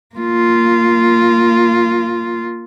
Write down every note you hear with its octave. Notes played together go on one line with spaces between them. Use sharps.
A#3 F4